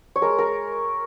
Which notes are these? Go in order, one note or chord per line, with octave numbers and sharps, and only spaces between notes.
C#5
G#3 A#4
A#4